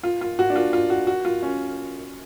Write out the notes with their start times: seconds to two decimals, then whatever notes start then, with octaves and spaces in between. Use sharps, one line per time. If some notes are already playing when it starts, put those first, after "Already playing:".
0.03 F4
0.21 F4
0.39 F#4
0.50 D4
0.56 F4
0.73 F4
0.90 F#4
1.07 F#4
1.25 F4
1.43 C#4